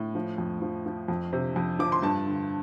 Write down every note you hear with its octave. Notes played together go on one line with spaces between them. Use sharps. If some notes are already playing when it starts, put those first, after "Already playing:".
Already playing: A2
F3
F2
F3
F3
F2
C3
F2
F3 D6
C6
G2 A5
D3